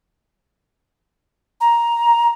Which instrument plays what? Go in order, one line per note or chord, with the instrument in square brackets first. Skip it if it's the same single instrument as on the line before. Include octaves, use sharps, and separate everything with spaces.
[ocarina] A#5